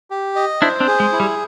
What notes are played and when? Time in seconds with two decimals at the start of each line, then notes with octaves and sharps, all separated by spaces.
0.10 G4
0.36 D#5
0.62 D4 E4 C5
0.80 C4 D4
0.87 G#4
1.00 G#3
1.13 E4
1.20 G3